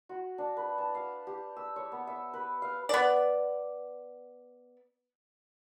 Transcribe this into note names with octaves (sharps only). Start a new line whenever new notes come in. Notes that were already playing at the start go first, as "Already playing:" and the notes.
F#4
D4
B4
A5
F5
G4
E6
C#5
B3
E5
B4
F5
B3 D5